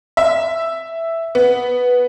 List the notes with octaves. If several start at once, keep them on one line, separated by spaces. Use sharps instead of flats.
E5
B3